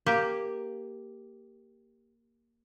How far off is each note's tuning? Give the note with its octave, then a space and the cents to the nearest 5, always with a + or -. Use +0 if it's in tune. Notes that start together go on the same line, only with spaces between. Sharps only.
A#3 +0 G4 +0